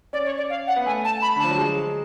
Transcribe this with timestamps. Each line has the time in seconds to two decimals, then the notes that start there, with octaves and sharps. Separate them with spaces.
0.13 C#4 D5
0.26 C#5
0.37 D5
0.50 F5
0.67 F#5
0.76 B3
0.86 A3 G#5
1.05 A5
1.22 B5
1.36 D3
1.40 F3 A5
1.50 F#3
1.58 G#3